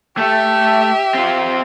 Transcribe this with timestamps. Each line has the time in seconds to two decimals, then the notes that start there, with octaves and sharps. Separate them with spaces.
0.17 A3 G4 E5
1.15 C4 F4